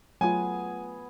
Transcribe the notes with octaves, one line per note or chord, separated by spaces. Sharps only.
F#3 A3 B3 F4 G#4 G#5